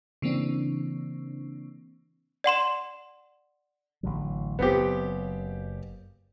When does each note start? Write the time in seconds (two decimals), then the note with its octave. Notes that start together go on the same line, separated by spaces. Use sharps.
0.22 C#3 E3 A#3 C4 D4
2.44 D5 F#5 C6 E7
4.03 A1 D3 F#3
4.59 F#1 F#3 B3 C4 G4